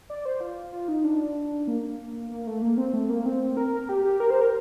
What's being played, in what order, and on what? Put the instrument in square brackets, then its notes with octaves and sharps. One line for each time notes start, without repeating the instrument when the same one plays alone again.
[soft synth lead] D5
C5
F4
F4
D#4
D4
A#3
A#3
A3
A#3
C4
A3
A#3
C4
A#4
A#4
G4
G4
A#4
C5
A#4